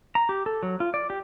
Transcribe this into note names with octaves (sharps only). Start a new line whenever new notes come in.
A#5
G4
A4
F#3
F4
D5
G4